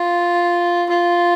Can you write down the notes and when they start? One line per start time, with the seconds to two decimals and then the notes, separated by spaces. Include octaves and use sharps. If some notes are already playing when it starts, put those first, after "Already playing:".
Already playing: F4
0.90 F4